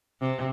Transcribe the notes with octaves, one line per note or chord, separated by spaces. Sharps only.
C3